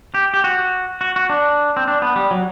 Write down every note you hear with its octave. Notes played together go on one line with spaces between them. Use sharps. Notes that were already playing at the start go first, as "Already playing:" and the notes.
G4
G4
F#4
F#4
F#4
D4
C4
D4
B3
G3
F#3